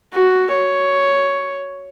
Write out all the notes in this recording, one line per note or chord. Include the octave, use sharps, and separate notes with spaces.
F#4
C#5